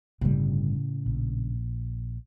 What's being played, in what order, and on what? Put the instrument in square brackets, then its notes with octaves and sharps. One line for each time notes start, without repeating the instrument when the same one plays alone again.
[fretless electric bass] G1 G3 [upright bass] A2 C#3
[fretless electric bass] A#1